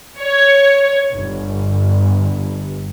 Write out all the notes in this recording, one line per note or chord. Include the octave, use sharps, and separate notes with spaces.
C#5
G1